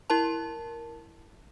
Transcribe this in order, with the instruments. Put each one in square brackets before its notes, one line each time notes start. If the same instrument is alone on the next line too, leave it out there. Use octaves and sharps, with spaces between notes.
[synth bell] E4 A#4 A5